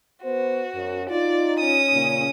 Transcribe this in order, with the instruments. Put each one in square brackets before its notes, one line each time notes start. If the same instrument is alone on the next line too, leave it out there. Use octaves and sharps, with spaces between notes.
[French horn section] B3 B4 C5 [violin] F#4
[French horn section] F#2
[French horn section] D#4 F4 [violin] D5
[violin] C#4 D#6
[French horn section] A#2 C#3 A#3